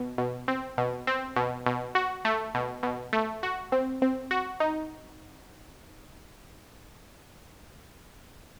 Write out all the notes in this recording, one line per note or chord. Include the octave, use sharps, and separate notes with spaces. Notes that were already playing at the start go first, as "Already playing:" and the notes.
Already playing: B2
B2
C4
B2
C4
B2
B2
F#4
A3
B2
B2
A3
F#4
C4
C4
F#4
D#4